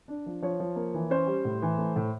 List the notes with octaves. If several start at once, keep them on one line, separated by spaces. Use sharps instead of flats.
D4
F3
F3 C#5
F3
A#3
E3
C#4 C5
G3
A2
E3
A3
A2